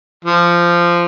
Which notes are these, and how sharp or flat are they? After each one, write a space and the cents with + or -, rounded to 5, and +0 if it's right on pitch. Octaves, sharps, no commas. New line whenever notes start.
F3 -15